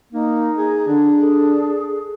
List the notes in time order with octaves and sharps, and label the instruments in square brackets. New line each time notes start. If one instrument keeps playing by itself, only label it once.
[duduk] A#3 [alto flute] D#4
[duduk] G#4
[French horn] D3 [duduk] D4
[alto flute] G#4 [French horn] A4